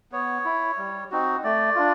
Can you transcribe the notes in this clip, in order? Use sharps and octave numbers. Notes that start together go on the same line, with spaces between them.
B3 C#5
E4
G3
C4 D#4 F#4
A3 D5
D4 F4